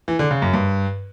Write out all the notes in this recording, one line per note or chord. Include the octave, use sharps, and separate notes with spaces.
E3
D3
C#3
F#2
G2